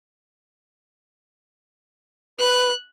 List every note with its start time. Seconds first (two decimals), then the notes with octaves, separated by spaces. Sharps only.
2.39 B4 F#6